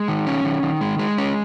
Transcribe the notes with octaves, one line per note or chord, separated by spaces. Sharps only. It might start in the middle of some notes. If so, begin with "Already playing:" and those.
Already playing: G#3
D#3
C#4
D#3
D#3
G#3
G#3
C#4